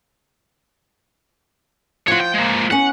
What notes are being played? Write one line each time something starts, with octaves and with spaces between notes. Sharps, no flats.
F3 F4 C#5 F#5
G5
G#3 A#3
B3 C#4 F#5